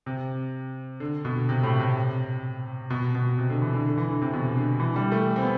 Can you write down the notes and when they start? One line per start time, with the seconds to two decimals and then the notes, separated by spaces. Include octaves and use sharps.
0.06 C3
1.00 D3
1.25 B2
1.49 C3
1.63 A2
1.80 C3
2.90 B2
3.15 B2
3.38 C3
3.50 D3
3.62 E3
3.73 D3
3.86 D3
3.97 E3
4.08 D3
4.22 C3
4.33 B2
4.57 D3
4.80 E3
4.96 G3
5.12 A3
5.36 C4
5.43 B3